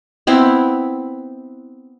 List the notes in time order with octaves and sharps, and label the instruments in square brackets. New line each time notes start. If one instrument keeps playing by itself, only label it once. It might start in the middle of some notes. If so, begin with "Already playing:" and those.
[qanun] B3 C4 E4